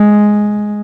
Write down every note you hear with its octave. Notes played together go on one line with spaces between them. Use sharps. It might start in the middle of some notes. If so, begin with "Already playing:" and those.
Already playing: G#3